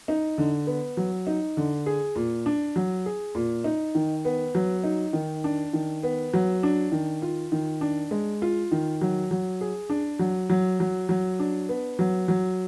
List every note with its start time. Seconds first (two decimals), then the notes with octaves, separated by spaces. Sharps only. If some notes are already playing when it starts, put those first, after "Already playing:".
0.08 D#4
0.38 D3
0.67 B3
0.97 F#3
1.27 D#4
1.57 D3
1.86 G#4
2.16 A#2
2.46 D4
2.76 F#3
3.06 G#4
3.35 A#2
3.64 D#4
3.95 D#3
4.25 B3
4.55 F#3
4.84 D#4
5.13 D#3
5.44 D4
5.73 D#3
6.03 B3
6.34 F#3
6.63 D4
6.92 D#3
7.22 F4
7.52 D#3
7.81 D4
8.11 G#3
8.42 F4
8.72 D#3
9.01 F#3
9.31 F#3
9.61 G#4
9.90 D4
10.19 F#3
10.50 F#3
10.80 F#3
11.09 F#3
11.39 D4
11.69 B3
11.99 F#3
12.28 F#3